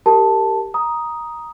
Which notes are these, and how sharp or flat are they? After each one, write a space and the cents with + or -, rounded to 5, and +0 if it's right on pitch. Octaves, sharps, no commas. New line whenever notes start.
G4 +0 A#4 -25 A5 +0
A#5 +10 D#6 +0